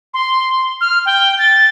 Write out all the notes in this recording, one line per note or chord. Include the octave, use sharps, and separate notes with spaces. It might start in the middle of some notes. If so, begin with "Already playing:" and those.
C6
F6
G5
A6